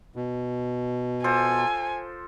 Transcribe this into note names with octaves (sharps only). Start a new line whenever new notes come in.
B2
F3 A4 C5 G#5